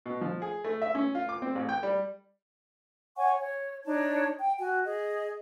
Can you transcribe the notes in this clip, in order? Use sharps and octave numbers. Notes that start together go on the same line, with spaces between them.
B2
F3
G#4
A3
E5
C#4
F4
D6
C4
A1
G5
G3
C#5 F#5 G#5 C#6
C#5
D4 D#4 C#5 A5
G5
F#4 G#5
G#4 D#5